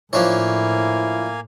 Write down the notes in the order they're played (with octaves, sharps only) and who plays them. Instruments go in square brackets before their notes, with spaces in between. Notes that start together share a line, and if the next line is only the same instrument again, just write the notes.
[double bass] A2 [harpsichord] F3 D4 C#5 [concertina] A#3 F5 G#5 [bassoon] E4